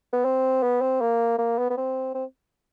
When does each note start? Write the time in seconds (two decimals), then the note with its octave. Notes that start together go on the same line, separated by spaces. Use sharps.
0.13 B3
0.24 C4
0.63 B3
0.81 C4
1.01 A#3
1.38 A#3
1.58 B3
1.70 B3
1.77 C4
2.14 C4